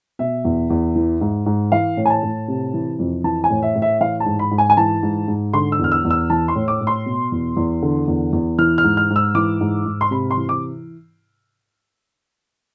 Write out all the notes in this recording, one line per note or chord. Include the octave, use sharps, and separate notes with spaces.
B2 E5
E2
E2
E3
G#2
G#2
E3 F5
A2
G#5
A5
A2
C3
E3
F2
E3 A5
G#5
A2
E5
A2
E5
E3 F5
A5
G#2
B5
G#2
G#5
G#5
E3 A5
G#2
G#2
D3 C6
E6
E2
F6
E6
E2
E6
E3 A5
C6
A2
D6
A2
C6
B2
E2
E2
D3
E2
E2
E3 F6
F6
G#2
F6
G#2
E6
E3 D6
G#2
G#2
C6
C3 B5
C6
E3
D6